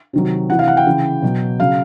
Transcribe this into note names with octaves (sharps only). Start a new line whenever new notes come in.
C3 D#3 F#3
C3 E3 F#5
F5
F#5
G5
C#3 E3
B2 F#3
C#3 F#3 F5